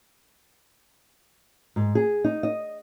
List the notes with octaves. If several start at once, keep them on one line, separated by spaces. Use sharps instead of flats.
G#2
G#4
D#4
D#5